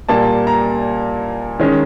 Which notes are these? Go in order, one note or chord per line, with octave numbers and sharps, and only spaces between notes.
A#2 G3 A#3 A5
A#5
D#3 G#3 C#4